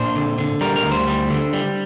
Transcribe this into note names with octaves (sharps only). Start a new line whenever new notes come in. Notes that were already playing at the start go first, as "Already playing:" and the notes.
Already playing: A#2 D4 C5
D3
D3
G3 A#4
A#4
D2
C5
G3
D3
G3